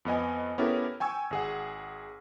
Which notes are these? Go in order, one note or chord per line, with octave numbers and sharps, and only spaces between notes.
F2 B3 D#5 G#5
B3 C#4 E4 G4 A4 A#4
G5 G#5 C#6 E6 G#6
G#1 G#4 F#5